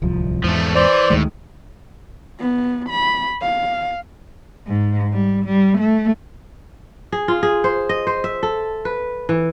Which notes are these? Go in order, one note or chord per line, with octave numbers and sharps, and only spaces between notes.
D1 C2 F3
E2 G#2 F3 A3
E3 C5 D5
D2 A2 D#3 G#3
B3
B5
F5
G#2
G3
G3
A3
G#4
F4
G#4
C5
D#5
C5
E5
A4
B4
E3